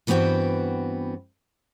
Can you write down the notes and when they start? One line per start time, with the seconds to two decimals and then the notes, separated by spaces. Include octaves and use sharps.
0.07 G2 E3 B3 C4 F#4 G5